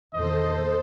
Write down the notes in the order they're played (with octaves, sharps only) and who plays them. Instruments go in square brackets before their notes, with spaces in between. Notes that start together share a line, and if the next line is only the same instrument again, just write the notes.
[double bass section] E2 A#2 D#3 [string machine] A4 C5 [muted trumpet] D#5